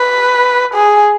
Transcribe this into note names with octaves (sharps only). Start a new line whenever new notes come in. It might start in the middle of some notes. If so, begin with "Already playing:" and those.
Already playing: B4
G#4